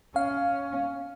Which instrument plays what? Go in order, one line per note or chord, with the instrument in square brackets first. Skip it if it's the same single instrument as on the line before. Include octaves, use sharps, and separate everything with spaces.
[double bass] C#4 [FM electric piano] F5